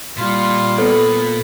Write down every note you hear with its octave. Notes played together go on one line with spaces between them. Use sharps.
A#2 G3 F4
B3 A4